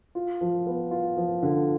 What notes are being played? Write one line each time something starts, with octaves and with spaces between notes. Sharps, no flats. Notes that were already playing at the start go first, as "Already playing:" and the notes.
F4
F3
B3
F4
F3
D3